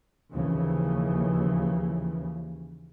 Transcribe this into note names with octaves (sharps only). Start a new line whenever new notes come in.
D#2 C#3 E3 F3